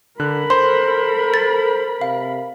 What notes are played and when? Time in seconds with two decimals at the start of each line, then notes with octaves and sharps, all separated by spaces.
0.20 D3 A#4 B5 F#6
0.50 A4 C5 C6
1.34 A6
2.01 C3 F5